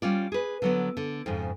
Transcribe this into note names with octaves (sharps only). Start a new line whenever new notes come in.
G3 C#4 F4 D5
G#4 B4
D3 F#3 B3
D3
F2 G#2 C#3